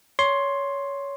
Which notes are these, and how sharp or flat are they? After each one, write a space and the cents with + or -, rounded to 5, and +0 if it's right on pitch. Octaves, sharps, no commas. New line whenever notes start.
C#5 +15 C6 +10